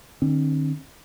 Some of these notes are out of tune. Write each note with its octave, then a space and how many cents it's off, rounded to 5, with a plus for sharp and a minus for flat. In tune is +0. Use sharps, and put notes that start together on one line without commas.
D#3 -45 C4 +45